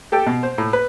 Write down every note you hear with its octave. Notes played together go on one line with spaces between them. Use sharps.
G4 A4 G5
B2
C5
A2
B4